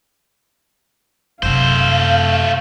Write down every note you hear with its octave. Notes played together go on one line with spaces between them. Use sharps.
F#2 C3 A3 C5 F5